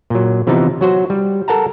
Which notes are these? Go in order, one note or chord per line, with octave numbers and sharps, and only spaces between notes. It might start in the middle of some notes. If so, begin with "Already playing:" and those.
A#2 F#3
C3 E3 F3 B3 D#4
F#3 F#4 C5
G3
A4 A#4 F#5 A5 A#5